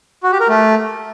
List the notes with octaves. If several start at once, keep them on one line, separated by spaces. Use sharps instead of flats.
F#4
G4
A#4
A3